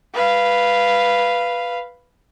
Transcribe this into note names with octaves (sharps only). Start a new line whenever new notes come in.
B4 F5